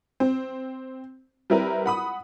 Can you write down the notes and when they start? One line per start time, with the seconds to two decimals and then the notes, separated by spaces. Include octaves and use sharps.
0.20 C4
1.50 G3 C4 E4 A#4 B4
1.86 F#5 B5 D#6